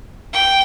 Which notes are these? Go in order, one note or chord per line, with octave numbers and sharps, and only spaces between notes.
G5